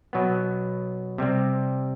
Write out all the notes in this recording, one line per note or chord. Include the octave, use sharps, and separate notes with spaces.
B2 F#3 B3
C3 G3 C4